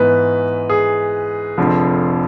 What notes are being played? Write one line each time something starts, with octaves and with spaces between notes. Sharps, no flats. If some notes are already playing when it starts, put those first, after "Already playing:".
Already playing: G#2 E3 B3 B4
G#4
F1 F2 D3 F3